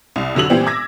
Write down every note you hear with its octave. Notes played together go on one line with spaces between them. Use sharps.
C2
F2 D3 F#3 F7 F#7
A#2 E3 G3 B3 C4
D6 E6 G#6 A#6 B6